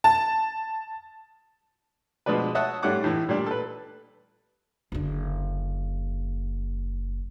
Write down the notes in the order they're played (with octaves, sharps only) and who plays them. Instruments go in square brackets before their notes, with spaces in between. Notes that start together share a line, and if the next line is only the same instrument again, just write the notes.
[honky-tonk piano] A5
[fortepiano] B2 F3 G#3 D4 B4
C#5 D#5 E5 F#5 A5
G#2 G3 A3 C#4 F#5 D6
A2 E3
A#2 G3 D4
A4 B4
[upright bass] F#1 D3